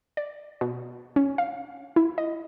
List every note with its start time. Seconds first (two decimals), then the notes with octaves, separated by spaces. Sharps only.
0.17 D5
0.61 B2
1.16 C#4
1.38 F5
1.96 E4
2.18 D#5